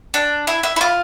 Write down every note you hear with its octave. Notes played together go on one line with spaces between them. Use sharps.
D4
E4
E4
E4
F4